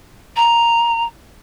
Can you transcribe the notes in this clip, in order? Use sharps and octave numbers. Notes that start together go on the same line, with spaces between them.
A#5